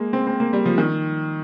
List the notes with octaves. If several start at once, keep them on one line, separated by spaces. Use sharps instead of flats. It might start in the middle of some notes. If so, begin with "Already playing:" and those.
Already playing: G#3 A#3
C4
C4
A#3
G3
F3
D#3